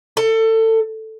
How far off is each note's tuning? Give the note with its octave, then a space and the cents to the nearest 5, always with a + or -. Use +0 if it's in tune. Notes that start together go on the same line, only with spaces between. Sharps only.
A4 +25